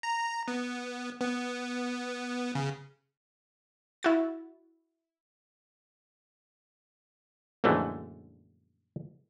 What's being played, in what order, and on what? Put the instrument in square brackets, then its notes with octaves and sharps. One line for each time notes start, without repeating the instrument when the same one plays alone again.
[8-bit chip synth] A#5
B3
B3
C#3
[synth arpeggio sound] E4 F#4 A6
[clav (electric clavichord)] A#1 F#2 D3 E3 G#3 A3